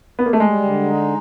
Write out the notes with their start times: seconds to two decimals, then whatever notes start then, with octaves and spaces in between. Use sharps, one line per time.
0.19 B3
0.26 A#3
0.33 A3
0.40 G3 G#3
0.63 D3
0.83 D#4